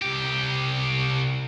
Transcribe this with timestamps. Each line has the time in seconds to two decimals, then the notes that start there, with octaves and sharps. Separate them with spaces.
0.02 C2 G4